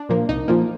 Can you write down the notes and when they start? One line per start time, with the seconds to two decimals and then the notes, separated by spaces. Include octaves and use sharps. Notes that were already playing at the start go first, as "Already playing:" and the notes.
Already playing: D4
0.09 A#2 F3 A#3
0.29 C2 D#4
0.48 A#2 F3 A#3